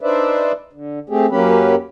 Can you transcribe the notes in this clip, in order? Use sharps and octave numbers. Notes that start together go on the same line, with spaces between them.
D4 D#4 B4 C5 D5 E5
D3
A3 C4 G4 G#4
F#2 F#3 A#3 C#4 G4 B4